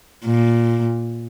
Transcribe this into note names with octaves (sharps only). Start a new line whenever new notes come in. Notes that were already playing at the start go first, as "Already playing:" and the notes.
A#2